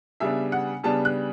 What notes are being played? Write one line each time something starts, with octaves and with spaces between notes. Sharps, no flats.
C#3 G3 B3 D4 E5
F#5
C#3 G3 B3 D4 A5
F#6